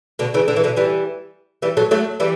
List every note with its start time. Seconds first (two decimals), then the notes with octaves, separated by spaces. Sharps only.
0.19 B2 D3
0.34 C#3 E3
0.48 D3
0.56 E3
0.64 B2 D3
0.76 E3 G3
1.62 E3 G3
1.77 F#3 A3
1.91 F#3 A3
2.20 E3 G3